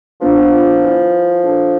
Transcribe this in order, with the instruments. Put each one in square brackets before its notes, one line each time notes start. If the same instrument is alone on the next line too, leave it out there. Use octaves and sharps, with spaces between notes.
[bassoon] F3 [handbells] B3 D4 F4 B4
[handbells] E4 B4 D5 G#5
D4 A4 D5 A5